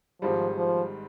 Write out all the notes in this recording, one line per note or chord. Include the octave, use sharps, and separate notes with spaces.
G#1 G#2 F3 G3
F3